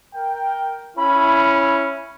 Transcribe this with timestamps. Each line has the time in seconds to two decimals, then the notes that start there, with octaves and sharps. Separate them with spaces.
0.14 A#4 G5
0.97 C#4 E4 B5